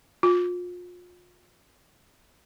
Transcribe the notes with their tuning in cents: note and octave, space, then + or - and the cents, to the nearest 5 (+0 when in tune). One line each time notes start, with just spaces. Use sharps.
F4 +35